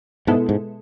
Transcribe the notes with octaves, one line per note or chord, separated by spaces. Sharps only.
G#2 B2 G#3 B3 E4 A4
G#2